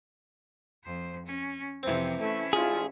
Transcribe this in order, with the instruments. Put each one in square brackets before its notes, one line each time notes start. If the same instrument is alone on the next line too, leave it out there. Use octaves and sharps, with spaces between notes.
[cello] F2 C5
C#4
[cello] F2 C3 [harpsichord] E3 C4
[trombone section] A3 [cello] C#4 E4
[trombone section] A1 G#2 F4 [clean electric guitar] G#4